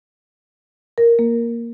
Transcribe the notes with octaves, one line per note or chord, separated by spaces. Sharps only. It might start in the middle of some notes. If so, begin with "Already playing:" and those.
A#4
A#3